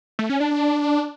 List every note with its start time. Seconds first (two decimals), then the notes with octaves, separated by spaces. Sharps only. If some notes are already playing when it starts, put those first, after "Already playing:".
0.19 A3
0.30 C#4
0.40 D4
0.51 D4